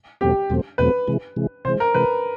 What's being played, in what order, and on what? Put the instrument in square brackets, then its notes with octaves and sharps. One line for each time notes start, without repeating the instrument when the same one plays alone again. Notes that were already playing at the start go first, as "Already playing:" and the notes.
[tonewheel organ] E2 B2 F#3 A3 C4 [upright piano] G4
[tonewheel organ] E2 B2 F#3 A3 C4
[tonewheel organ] E2 B2 F#3 A3 C4 [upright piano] B4
[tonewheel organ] C3 E3 G#3
C3 E3 G#3
[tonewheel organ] C3 E3 G#3 [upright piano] C5
[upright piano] A#4
[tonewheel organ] C3 E3 G#3 [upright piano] B4